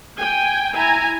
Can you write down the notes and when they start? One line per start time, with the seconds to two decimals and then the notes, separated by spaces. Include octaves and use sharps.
0.19 G5 G#5
0.74 E4 G#5 A#5